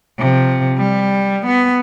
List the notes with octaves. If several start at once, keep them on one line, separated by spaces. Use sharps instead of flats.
C3 F3
G3
B3